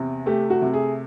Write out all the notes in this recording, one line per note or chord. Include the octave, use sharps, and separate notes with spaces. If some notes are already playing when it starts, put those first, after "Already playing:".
Already playing: E2 C3
A3 G4
F#4
C3
G#4